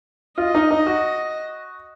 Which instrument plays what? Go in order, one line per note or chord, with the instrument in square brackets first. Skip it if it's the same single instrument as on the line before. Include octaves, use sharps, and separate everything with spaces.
[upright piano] F4 [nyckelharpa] D#5
[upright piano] D#4
D#4
F#4